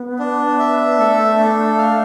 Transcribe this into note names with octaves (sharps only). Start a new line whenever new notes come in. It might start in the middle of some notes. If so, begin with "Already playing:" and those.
Already playing: B3
D4
E5
A3 A4
D4
F5